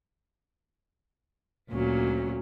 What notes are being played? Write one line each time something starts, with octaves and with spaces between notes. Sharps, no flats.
D2 A#2 F#3 C#4